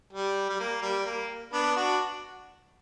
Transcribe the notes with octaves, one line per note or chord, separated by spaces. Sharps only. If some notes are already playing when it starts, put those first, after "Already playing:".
G3
G3
A#3
G3
A#3
B3 D4
D4 F#4